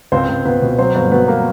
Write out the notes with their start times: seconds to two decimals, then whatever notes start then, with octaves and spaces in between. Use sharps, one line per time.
0.12 C#2 C4 C5
0.29 C#2
0.45 C#2 B3 B4
0.62 B2
0.78 F#3 C4 C5
0.95 G1
1.11 F#3 B3 B4
1.28 A#3 A#4